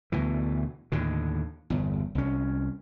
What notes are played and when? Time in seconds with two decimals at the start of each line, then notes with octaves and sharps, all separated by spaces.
0.12 D2 B2 E3
0.92 D#2 A2 D3
1.70 G1 E2
2.15 C2 C#4